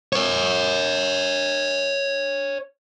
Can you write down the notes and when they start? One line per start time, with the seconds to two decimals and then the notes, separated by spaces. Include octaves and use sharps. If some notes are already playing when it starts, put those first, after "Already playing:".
0.13 A#4 C#5